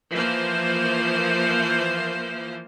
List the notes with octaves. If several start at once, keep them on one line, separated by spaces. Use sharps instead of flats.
E3 F3 A#3 C5 F5